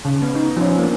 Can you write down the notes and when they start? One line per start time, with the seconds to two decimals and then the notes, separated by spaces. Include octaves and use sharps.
0.05 C#3
0.22 B3
0.35 D#4
0.57 F3 C#4
0.79 A#3 D4